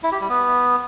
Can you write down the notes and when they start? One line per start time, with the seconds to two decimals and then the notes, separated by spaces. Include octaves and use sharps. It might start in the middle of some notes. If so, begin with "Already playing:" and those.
0.04 E4
0.12 G4
0.21 G3
0.30 B3